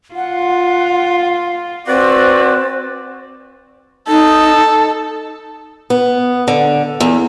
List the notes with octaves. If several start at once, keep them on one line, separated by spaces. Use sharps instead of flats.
F4 F#5
C4 F#4 B4 D5
D#4 A4
B3
D3
E2